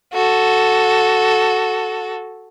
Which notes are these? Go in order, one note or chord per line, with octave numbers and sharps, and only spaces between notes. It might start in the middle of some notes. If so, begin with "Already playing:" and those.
F#4 A4